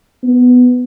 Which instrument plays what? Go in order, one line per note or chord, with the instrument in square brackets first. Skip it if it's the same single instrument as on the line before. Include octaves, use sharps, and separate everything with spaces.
[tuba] B3